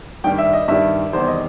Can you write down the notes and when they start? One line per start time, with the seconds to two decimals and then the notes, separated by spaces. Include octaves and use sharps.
0.24 G2 D#3 G3 G5
0.38 E5
0.53 D#5
0.68 G2 D#3 G3 E5
1.13 E2 C3 D#3 G3 C5
1.28 D#5